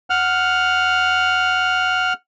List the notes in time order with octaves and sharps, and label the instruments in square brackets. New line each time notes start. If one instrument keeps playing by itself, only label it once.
[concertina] F#5 F6